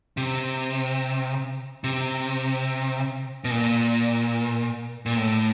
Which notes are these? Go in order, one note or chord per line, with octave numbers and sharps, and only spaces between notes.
C3
C3
B2
A#2
A#2
A2